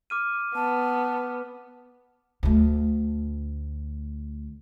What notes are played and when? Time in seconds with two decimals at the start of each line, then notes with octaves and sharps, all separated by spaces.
0.10 D6 F6 D#7
0.55 B3 A5
2.43 D2 A3